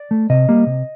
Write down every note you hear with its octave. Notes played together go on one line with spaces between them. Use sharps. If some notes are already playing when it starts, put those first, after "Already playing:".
Already playing: D5
A3
C3 D#5
G3 A#3
C3